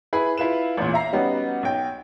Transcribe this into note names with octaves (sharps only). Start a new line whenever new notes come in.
E4 G#4 B4 B5
E4 F4 B4 E7
A1 E2 A#2
E5 A#5 C7
G3 B3 C#4 D#4 F#4
B1 G5